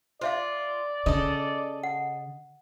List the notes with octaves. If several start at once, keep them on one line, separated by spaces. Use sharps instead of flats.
F4 C5 D5 E5 F5
C#3 A4 D#5
F#5